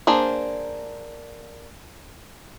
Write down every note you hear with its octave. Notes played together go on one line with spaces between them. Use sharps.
A#3 D4 G#4 C5